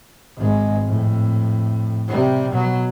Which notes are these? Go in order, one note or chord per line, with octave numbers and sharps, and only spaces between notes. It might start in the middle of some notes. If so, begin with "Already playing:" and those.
G#1 G#3
F2 A2
C3 G3
B2 F#3